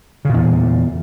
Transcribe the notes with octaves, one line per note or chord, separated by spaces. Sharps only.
E2 A#2 C#3